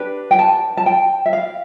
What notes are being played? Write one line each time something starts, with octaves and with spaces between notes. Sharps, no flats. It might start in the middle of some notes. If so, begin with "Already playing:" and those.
Already playing: D4 G4 B4
G5
A5
A5
G5
E5
F5